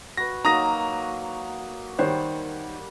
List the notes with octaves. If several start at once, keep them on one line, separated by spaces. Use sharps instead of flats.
F#4 B4 A#6
F#3 A#3 D#4 A#5 D#6 A#6
D#3 G3 C5 C#5 F#5